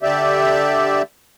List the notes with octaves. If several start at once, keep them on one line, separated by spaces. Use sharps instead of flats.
D3 G4 D5 E5